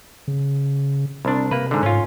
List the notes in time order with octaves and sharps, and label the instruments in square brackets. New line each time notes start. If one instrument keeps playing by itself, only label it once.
[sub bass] C#3
[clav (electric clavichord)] C2 D4
[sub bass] C3 [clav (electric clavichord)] A#3 B4
[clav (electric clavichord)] G#2 D3
[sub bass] G#2 [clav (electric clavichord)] C#4 F4